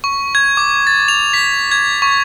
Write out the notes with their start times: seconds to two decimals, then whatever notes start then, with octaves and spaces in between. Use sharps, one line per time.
0.04 C#6
0.35 G#6
0.57 D6
0.87 A6
1.08 F7
1.34 B6
1.71 G#6
2.02 C#6